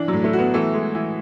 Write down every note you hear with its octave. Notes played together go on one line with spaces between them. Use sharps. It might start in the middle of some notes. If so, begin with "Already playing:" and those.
Already playing: E3 D4
A2 F#3
A3
F#4
B3
E3 A3
G#3
E3